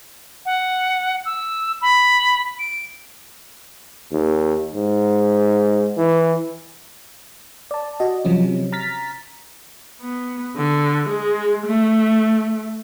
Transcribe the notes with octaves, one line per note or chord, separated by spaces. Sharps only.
F#5
E6
B5
D7
D#2
G#2
E3
D5 A5
F#4 D#5
C3 F3 F#3 C#4
A#5 F6 A6 B6
B3
D3
G#3
A3